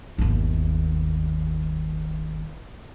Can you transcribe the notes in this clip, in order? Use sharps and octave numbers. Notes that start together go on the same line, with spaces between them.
G1 D#2